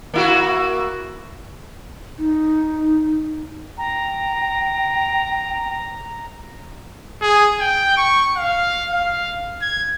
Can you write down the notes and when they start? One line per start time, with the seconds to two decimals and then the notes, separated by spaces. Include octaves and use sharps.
0.14 A#3 E4 F#4
2.18 D#4
3.78 G5 A#5
7.21 G#4
7.60 G5
7.97 C#6
8.37 F5
8.92 F5
9.62 G#6